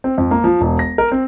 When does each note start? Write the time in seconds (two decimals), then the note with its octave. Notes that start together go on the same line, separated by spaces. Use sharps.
0.04 C4
0.18 F2
0.31 A#3
0.44 F3
0.61 E1
0.79 A#6
0.98 A#4
1.12 C4